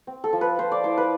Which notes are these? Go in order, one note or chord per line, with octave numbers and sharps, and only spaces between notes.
C4
A4
F3
B4
F3 C5
D5
E4 C5
B4